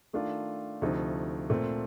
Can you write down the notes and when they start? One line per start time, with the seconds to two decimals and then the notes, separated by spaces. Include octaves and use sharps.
0.13 D#3 A3 D4 F4
0.82 D2 C3 F3 A3 D#4
1.50 A#2 A3 C4